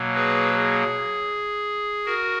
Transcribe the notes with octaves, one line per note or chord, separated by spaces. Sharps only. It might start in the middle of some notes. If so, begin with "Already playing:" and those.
Already playing: B2 F#3 A#3
G#4 B4
G#4
F#4 A#4